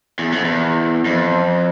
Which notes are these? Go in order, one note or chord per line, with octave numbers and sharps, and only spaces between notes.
E2
F2
E2
F2